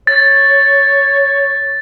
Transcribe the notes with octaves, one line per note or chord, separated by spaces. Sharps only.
C#5 A6